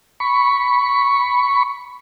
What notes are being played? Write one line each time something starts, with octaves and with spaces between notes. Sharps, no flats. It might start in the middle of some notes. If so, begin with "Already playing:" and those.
B5 C#6